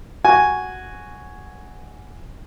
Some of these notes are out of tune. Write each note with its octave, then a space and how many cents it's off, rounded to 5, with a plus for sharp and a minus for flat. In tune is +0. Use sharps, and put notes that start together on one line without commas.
F#4 +0 G#5 +0